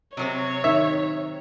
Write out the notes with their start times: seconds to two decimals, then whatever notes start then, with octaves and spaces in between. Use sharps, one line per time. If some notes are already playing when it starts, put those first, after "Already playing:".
0.17 C3 F#3 C4 C#5
0.64 D#3 E5